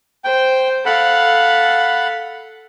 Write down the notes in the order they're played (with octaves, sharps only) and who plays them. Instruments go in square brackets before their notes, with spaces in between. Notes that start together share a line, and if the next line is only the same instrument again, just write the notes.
[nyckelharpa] C5 [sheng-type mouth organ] G5
[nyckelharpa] A4 F5 [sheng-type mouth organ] F#5 B5